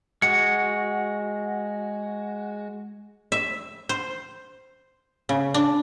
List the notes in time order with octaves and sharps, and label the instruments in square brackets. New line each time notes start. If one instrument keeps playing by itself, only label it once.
[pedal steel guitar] G#3 F#4 [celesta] C#7
[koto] E5
C5
C#3
D4